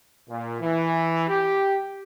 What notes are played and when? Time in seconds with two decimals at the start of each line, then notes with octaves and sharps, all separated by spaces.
0.30 A#2
0.61 E3
1.29 G4